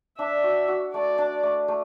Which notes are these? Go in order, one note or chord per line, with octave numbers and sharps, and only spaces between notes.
D4 E5
F#4
F#4
A3 D5
D4
A3
A3